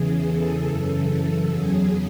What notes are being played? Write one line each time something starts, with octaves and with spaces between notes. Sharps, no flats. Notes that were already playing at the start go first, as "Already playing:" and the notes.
Already playing: E2 C#3 E3 G#4
A4
F#2 C#3 E3
E2 C#3 F#3 G#4